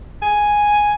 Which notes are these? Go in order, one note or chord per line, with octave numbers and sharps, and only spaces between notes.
G#5